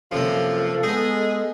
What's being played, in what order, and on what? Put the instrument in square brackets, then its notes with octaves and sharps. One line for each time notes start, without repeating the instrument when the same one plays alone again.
[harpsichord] F#2 C3 A#3 [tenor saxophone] F3 [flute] A4
[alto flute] G#3 [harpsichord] B3 D#4 [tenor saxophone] G#4